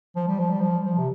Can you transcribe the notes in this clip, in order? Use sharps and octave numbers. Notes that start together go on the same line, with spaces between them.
F3
G3
F3
G3
F3
F3
C3